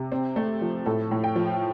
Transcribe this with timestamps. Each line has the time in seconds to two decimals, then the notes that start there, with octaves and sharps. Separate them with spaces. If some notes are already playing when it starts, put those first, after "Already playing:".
Already playing: C3
0.12 C4
0.36 A3
0.62 F3
0.86 A2 A4
1.11 A2
1.24 G5
1.36 F3